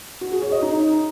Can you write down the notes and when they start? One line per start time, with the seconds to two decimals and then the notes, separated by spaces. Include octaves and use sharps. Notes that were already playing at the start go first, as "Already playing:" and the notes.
0.21 F#4
0.31 G#4
0.42 C#5
0.52 D#5
0.62 D#4